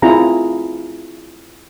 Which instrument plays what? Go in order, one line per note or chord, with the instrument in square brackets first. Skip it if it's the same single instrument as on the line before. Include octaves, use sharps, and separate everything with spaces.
[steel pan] C4 E4 F4 G#4 A#5